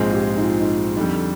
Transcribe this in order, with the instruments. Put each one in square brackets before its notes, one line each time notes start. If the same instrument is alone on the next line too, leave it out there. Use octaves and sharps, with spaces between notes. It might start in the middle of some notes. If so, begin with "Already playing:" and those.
Already playing: [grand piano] A#1 G#2 F3 G#3 C4 [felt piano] G#4
[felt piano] F4
G4
D#4
F4
D#4
[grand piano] F2 D3 G3 [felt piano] D#4